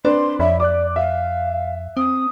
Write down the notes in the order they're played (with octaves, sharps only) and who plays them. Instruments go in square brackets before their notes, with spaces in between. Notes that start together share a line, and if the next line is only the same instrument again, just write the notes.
[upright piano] C4 B4 D5 [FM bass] D4 [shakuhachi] C6
[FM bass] F2 [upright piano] C#5 D5 B5 [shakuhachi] E5
[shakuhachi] D5 [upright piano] D6 F#6
[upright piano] E5 [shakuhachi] F5
[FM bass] C4 [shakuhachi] D#6